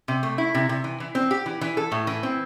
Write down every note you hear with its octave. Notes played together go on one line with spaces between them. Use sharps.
C3
A3
E4
C3
C3
E3
E3
C4
G4
E3
E3
A4
A2
E3
C4